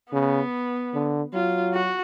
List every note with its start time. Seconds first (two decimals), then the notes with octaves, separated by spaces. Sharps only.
0.13 C#3 B3
0.94 D3
1.33 F#3 F4
1.74 F#4